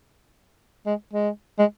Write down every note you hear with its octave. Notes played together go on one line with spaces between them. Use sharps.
G#3
G#3
G#3